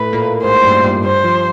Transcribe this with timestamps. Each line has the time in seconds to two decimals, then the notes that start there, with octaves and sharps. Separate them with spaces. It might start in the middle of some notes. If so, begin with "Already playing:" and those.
Already playing: A2 A3 B4
0.13 A#2 A#3
0.44 G#2 G#3 C5
0.64 G2 G3
0.84 G2 G3
1.04 G2 G3 C5
1.24 F3